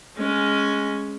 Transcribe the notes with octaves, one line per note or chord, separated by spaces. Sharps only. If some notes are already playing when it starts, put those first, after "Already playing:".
G#3 C#4